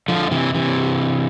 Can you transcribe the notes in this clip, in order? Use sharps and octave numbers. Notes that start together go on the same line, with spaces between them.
D3 F3
C3 E3
C3 E3